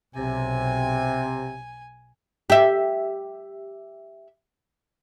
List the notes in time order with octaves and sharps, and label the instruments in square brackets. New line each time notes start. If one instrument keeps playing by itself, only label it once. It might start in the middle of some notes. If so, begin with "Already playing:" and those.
[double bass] B1 [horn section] C3 [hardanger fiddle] G#5
[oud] G4 E5